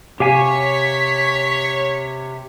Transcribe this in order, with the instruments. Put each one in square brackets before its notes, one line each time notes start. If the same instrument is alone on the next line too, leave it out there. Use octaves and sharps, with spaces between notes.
[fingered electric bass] C3 [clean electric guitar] G4 F5 G#5 [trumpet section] C#5 [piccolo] B6